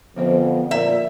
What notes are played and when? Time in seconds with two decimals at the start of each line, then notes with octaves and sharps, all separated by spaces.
0.16 F2 D3 F3 B3 C5
0.71 A#2 A#3 A#4 D5 E5 A#5